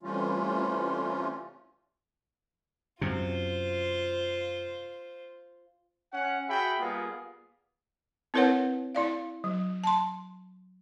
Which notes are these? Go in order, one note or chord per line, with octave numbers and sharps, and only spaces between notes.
C3 E3 G3 A3 C#4 F4
F#2 C3 F4 C5
C#4 F#5
F#4 G#4 E5 G5 B5
G3 A#3 B3 F4 G#4
C4 E4 A#4 B4 C#5 F#5
E4 D5 F5
F#3
A5 C6